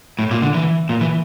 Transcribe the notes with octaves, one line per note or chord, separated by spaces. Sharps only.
A2
A#2
D3
E3
A#2
E3